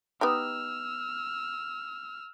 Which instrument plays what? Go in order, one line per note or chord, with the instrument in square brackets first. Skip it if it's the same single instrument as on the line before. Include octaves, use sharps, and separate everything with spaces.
[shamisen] B3 D#4 G4 [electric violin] E6 F6